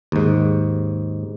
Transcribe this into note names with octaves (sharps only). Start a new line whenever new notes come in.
D#2 G#2